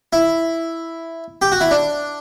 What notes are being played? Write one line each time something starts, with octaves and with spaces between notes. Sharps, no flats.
E4
G4
F#4
E4
D4